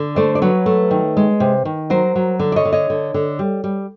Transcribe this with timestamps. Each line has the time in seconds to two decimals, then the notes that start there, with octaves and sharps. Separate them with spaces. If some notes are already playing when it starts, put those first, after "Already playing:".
Already playing: D3
0.16 A3 C5 D5
0.35 D5
0.42 F#3 B4 C#5
0.66 A3
0.91 D#3
1.17 G#3
1.40 C3
1.65 D#3
1.90 F#3 A#4 C5
2.16 F#3
2.39 D3
2.52 D5
2.56 C#5 D#5
2.65 D3
2.73 C#5 D#5
2.90 D3
3.14 D3
3.39 G3
3.64 G3